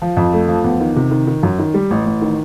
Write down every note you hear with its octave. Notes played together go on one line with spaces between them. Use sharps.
F3
F2
A3
F3
E2
D#3
C3
D#3
D#3
F#2
D#3
G3
A1
A1
D#3